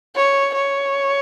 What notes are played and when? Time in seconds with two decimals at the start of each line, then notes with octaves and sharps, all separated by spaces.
0.16 C#5
0.55 C#5